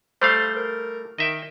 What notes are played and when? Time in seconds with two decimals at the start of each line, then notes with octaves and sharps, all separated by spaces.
0.22 G3 A3 C5 F5
0.56 A#4
1.18 D#3 D#5 E5 G5